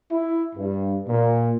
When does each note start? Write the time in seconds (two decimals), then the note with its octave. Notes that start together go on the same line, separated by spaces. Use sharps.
0.11 E4
0.56 G2
1.08 A#2